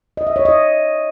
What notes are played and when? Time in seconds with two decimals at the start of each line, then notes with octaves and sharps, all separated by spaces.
0.17 D#5
0.27 E5
0.36 C#5
0.45 D#5